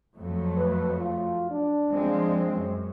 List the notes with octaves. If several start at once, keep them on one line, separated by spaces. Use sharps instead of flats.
F2 F#3 A3
B4
F4
D4
F3 G#3 C4
F#2